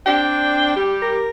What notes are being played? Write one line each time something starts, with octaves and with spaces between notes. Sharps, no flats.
C4 D4 G5
G3 G4
A#4